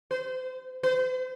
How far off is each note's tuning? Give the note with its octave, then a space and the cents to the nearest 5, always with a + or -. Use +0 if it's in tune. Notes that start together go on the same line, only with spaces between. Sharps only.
C5 -35
C5 -45